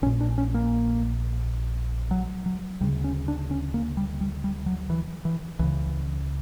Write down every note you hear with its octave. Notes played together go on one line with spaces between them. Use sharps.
A#1 A#2 C#4
D4
C#4
A#3
F#3
F#3
D2 C#3 G3
C#4
D4
C#4
A#3
G3
G3
G3
F#3
E3
E3
C#2 C#3 E3